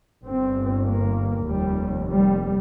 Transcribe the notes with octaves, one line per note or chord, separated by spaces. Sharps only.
G1 G2 C4
A#3
F1 D#2 G3
G3